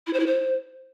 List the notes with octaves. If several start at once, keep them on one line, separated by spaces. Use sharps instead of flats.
E4
C5
E4
C5